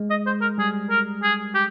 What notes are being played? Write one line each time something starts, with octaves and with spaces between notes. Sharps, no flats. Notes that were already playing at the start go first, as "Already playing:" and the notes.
Already playing: G#3
D#5
C5
A#4
G3 G#4
A#4
G#4
G4